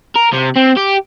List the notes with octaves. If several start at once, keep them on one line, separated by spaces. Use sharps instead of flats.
A#4
C3
C4
G4